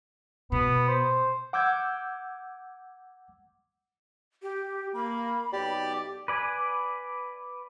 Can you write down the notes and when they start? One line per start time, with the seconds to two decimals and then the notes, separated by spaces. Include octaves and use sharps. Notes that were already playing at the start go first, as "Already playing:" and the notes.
0.52 B2 B3
0.88 C5
1.53 F#5 D6 E6 G6 G#6
4.43 G4
4.94 A#3 B5
5.53 B1 G4 D5
6.28 B4 D5 G#5